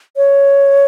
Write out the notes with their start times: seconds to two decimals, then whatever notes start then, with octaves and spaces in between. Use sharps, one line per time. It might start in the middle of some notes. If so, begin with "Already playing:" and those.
0.17 C#5